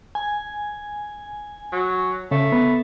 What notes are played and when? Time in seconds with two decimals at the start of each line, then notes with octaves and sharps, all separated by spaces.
0.15 G#5
1.72 F#3
2.31 C#3 A3
2.52 B3